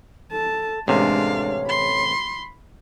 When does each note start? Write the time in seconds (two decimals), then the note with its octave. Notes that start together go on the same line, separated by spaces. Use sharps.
0.31 A4 A5
0.88 A1 C3 G#3 D4 C#5 F5
1.69 B5 C6